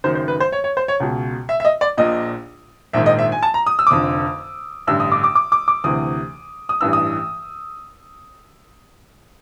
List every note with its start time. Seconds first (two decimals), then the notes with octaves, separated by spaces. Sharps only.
0.04 F#1 F#2 D#3 C5
0.15 C5
0.28 B4
0.40 C5
0.52 C#5
0.64 C#5
0.77 C5
0.88 C#5
1.00 C#2 B2
1.49 E5
1.60 E5
1.65 D#5
1.81 D5
1.98 A#1 A#2 D#5
2.93 A#1 G#2 D#3 E5
3.06 D#5
3.19 E5
3.32 G#5
3.43 A5
3.54 A#5
3.66 D#6
3.79 E6
3.87 D6
3.91 F1 F2 D3 D#6
4.87 A1 G2 D3 E6
5.00 D#6
5.12 D6
5.24 D6
5.35 D6
5.52 D6
5.68 D6
5.84 D2 C3 E3 D#6
6.69 D#6
6.81 A1 G2 E3 E6
6.93 D#6